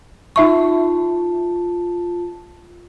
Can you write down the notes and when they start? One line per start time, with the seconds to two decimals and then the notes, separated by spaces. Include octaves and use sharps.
0.36 D#4 F4 E5 A5 C#6